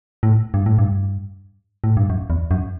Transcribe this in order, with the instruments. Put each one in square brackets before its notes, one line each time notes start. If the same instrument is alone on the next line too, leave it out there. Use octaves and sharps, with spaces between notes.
[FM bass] A2
G2
A2
G2
A2
G2
F#2
E2
F#2